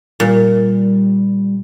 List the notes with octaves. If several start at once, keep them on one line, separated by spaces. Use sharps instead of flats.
A#2 G3